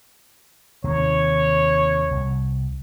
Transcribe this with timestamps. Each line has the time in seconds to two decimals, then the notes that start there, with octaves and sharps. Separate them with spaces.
0.84 D#2 C3 D#3 C#5
2.11 C2